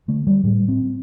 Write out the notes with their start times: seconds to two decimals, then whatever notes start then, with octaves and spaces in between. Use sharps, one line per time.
0.08 D3 A3
0.27 G3
0.44 A2 G3
0.68 C4